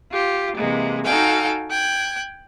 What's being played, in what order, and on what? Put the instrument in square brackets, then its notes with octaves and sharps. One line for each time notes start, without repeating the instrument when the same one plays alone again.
[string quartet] F4 G4
C3 E3 G#3 A#3
D#4 F#4 A4 F5 G5 G#5
G5 F#6 G#6